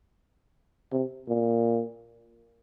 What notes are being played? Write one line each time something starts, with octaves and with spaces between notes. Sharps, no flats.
C3
A#2